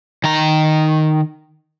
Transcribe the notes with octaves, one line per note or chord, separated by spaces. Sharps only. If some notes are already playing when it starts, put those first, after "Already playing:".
D#3 A#5